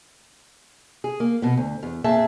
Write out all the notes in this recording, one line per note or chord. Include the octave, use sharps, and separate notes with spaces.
G#4
A#3
B2 B3
D2
E2
F2 A#2 G#4 E5 A5